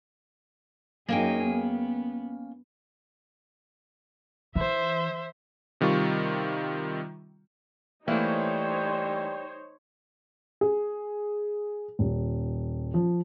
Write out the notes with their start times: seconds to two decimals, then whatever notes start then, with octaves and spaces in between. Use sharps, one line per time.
1.09 F#2 A#3 C#4 D#4 G#4 G5
1.45 B3
4.55 E3 C5 E5
5.81 C3 D#3 G3 F4 C#6
8.08 E3 G3 A3 A#3 D#4 E4 C5 C#5
10.61 G#4
11.99 D#1
12.94 F3